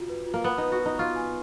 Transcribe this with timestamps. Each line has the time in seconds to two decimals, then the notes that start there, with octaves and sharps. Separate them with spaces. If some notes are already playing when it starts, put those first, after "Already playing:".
Already playing: F4 F#4
0.09 B4
0.26 F4
0.34 A#3
0.44 B3 B4
0.58 D#4 B4
0.72 F#4
0.81 B4
0.86 D#4
0.98 F4 C#6
1.16 G#5